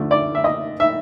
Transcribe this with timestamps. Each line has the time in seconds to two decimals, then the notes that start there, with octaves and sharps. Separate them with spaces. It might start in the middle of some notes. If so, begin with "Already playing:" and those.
Already playing: D2 D3 F3 A3
0.11 D5
0.35 E5
0.44 D#5
0.80 E5